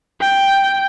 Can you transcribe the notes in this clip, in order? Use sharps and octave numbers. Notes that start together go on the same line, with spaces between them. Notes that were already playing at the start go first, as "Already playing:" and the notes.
G5